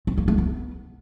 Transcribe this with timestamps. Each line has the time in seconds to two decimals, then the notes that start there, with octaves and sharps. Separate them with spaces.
0.07 C4
0.18 A#3
0.28 A3
0.38 B3